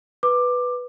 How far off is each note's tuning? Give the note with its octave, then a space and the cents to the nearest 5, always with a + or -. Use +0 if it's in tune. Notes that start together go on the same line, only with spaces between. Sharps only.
B4 +0 D6 +15